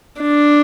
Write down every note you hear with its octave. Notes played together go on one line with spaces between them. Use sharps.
D4